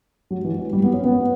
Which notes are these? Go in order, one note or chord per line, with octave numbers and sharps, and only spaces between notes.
F#3
E3
F#3
G3
B3
C#4
B3